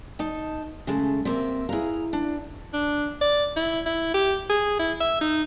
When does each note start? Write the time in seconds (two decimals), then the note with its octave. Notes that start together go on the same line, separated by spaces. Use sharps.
0.19 D#4 A5
0.87 C#3 G#3 A3
1.25 C3 A#3 C4 E5
1.69 E4 G#4 B4 F5 A#5
2.13 D4
2.73 D4
3.21 D5
3.56 E4
3.86 E4
4.14 G4
4.50 G#4
4.79 E4
5.00 E5
5.21 D#4